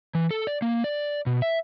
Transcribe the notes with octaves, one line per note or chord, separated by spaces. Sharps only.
E3
A4
D5
A#3
D5
B2
E5